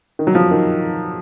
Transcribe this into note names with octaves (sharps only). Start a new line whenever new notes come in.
D#3
F#3
F3
D#3